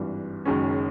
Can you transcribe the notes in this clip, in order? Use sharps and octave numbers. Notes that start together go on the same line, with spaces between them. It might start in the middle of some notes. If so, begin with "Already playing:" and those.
Already playing: G#1 G2 E3
F#1 F#2 D#3 G#3 C#4